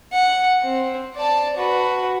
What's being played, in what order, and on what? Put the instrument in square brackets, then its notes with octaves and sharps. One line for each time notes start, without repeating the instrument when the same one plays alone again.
[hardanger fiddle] F#5
C4
D5 A5
F#4 B4